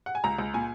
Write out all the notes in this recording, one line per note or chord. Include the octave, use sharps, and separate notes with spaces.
F#5
G#5
C#2 A#5
C#2
A#2 G#5